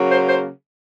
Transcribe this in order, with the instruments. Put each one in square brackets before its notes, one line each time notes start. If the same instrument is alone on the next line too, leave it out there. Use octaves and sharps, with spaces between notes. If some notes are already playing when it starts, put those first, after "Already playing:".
Already playing: [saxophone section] C#3 F#3 A#3 C#4
C5
C5